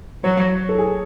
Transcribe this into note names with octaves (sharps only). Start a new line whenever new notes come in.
F#3 C#5
A4
G#4